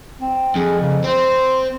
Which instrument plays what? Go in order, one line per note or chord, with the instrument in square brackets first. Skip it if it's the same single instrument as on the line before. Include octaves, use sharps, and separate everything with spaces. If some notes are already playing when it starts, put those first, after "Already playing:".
[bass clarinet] C4
[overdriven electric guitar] F2 [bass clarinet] G#4
[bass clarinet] C#3
[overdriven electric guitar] C4 [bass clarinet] C5